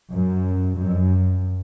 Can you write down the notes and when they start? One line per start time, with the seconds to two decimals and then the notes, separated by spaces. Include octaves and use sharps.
0.12 F#2
0.77 F#2